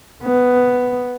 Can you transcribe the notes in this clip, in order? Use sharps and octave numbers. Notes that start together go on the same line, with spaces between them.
B3